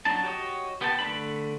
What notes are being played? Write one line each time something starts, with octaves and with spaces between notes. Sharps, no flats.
F#3 D4 D#4 A5
F#4 G4 C#5 D#5
B3 G4 B4 G5 A5
D3 A3 D4 B4 B5